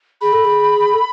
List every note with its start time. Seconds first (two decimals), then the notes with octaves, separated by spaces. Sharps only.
0.21 G#4 B5
0.33 A4
0.45 G#4
0.94 A4